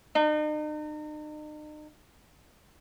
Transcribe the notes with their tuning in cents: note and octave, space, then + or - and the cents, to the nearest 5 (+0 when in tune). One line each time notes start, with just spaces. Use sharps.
D#4 -40